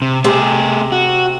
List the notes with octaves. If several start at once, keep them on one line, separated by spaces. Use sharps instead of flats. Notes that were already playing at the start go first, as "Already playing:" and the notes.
C3
C3 A3 G#4
F#4